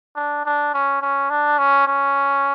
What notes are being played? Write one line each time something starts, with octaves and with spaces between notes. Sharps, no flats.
D4
D4
C#4
C#4
D4
C#4
C#4